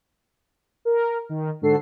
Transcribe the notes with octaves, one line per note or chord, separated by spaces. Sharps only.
A#4
D#3
G#2 D3 F#4 A4 C7